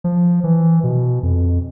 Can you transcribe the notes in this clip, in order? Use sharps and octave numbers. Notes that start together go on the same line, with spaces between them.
F3
E3
B2
F2